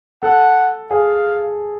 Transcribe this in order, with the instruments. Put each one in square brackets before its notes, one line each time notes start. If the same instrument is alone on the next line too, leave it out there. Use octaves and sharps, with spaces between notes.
[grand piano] A4 A5 [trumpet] F#5
[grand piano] G#4 G#5 [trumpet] F5